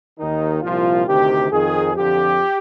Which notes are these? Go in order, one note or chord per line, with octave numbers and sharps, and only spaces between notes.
D#2 D#3 D#4
C2 A#2 F3 F4
D2 C3 D#3 G4
F2 D#3 G#4
F2 D3 F3 G4